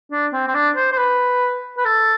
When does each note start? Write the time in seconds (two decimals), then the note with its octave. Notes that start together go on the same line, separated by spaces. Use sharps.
0.11 D4
0.33 C4
0.47 C4
0.54 D4
0.76 C5
0.92 C5
0.98 B4
1.77 B4
1.85 A4